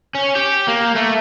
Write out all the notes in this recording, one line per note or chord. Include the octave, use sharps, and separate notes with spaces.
C#4
G4
A#3
A3